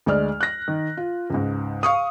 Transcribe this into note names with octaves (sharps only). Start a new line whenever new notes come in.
D2 G#3 D5 F6
F#6 A#6
D#3
F4
C#2 G#2
F5 C#6 D#6